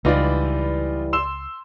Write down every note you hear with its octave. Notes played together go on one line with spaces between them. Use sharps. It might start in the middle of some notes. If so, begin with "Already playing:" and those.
C#2 E3 G3 D#4 F4 D5
C6 E6 E7